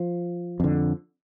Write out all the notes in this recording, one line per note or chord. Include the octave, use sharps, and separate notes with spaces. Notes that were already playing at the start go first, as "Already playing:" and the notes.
Already playing: F3
F2 D3